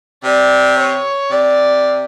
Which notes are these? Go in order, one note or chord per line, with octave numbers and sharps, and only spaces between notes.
C3 D5
C#5
C3 D5